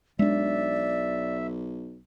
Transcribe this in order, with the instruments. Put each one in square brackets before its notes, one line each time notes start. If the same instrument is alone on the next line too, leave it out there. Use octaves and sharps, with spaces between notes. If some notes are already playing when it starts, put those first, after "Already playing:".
[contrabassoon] B1 [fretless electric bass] G#3 D4 [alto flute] D5 [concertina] E5